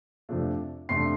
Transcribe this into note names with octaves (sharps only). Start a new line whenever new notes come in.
F2 C3 F3 A3 D4
F2 C3 F3 A3 D4 C6 C7